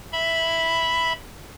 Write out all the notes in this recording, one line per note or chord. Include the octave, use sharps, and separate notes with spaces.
E5 B5